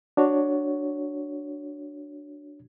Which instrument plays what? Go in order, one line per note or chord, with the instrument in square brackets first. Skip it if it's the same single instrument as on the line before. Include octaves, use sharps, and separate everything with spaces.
[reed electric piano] D4 F#4 C#5